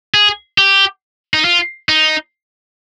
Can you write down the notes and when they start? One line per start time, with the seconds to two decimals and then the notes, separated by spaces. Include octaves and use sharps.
0.14 G#4
0.58 G4
1.34 D#4
1.45 F4
1.89 D#4